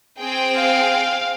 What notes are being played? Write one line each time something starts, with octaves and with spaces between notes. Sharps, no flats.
C4 G#4 G5
F5